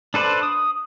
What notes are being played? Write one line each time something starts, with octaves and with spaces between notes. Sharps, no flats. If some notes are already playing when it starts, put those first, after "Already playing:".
D4 A4 B4 C5 D5
D#6